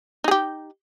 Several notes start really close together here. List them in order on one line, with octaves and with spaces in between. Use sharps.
D#4 G#4 G4